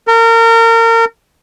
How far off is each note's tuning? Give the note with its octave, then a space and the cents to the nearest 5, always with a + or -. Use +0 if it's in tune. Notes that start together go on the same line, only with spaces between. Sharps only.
A#4 -30